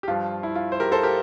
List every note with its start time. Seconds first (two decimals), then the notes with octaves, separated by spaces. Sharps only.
0.03 G4
0.08 G2 F3 F4
0.43 E4
0.56 F4
0.72 C5
0.80 G4 A#4
0.92 A4 C5
1.03 G4 A#4